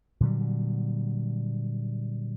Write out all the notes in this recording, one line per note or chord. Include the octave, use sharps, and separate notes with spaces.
A#2 D3 F#3 G3